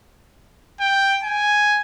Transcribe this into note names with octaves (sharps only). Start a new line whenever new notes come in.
G5
G#5